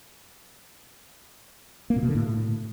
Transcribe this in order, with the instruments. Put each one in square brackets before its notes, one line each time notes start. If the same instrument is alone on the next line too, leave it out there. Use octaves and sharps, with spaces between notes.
[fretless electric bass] A#3
A#2
B2
D3
A2